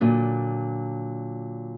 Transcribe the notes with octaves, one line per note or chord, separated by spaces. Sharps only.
A#2 D3 F#3